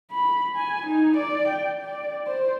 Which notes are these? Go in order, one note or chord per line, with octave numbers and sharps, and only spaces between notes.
B5
G#5
D#4
D5
G5
D5
C5